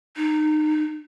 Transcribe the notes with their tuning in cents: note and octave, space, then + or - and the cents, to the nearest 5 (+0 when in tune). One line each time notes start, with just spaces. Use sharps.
D#4 -25